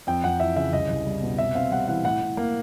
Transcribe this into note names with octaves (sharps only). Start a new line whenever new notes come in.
F2 G5
F2 F#5
E3 E5
C#3 E5
C2 D#5
C2
G3
B2
C3 E5
C4 F5
G3 F#5
E3 F#5
A2 F#5
A2
A#3